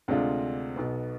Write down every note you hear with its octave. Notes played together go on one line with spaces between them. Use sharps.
D2 C3 G#3 D4 F4
B1 B2 B3